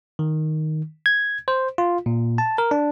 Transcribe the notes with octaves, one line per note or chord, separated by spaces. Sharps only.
D#3
G#6
C5
F4
A#2
A5
A#4
D4